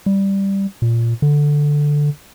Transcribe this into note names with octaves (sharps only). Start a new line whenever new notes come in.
G3
A#2
D3